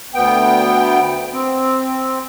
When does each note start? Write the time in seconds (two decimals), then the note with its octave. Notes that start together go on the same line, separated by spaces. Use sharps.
0.14 D2 B3 G5
1.33 C4